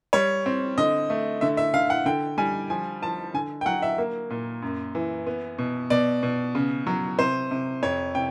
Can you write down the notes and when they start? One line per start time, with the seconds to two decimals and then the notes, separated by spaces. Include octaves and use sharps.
0.13 G3 C#5
0.46 C4
0.78 D3 D#5
1.10 A3
1.41 D3 E5
1.57 E5
1.74 D3 F5
1.90 F#5
2.06 D3 G5
2.38 G3 G#5
2.70 F3 G#5
3.02 F3 A5
3.34 D3 G#5
3.61 G5
3.66 F#3 F#5
3.82 E5
3.98 A#3
4.30 A#2
4.62 F#2
4.95 E3
5.27 B3
5.59 B2
5.90 B2 D5
6.23 B2
6.55 C#3
6.87 F#3
7.19 C3 C5
7.51 C3
7.83 F2 C#5
8.15 C3 G5